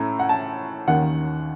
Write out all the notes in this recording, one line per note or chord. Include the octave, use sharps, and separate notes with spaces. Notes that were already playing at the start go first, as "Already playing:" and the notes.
Already playing: A2 A3 C#4 A#5
F#5
A5
D#2 D#3 A#3 C#4 F#5